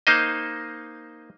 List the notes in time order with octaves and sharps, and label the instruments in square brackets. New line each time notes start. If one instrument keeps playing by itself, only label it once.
[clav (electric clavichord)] A#3 D#4 C5 D#5